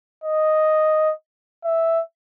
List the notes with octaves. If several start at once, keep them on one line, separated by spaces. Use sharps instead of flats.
D#5
E5